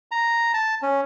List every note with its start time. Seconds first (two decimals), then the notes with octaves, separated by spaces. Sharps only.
0.11 A#5
0.54 A5
0.82 C#4